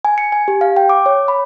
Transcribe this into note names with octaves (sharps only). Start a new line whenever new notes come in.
G#5
C#7
G#5
G4
F5
G5
D6
C#5
B5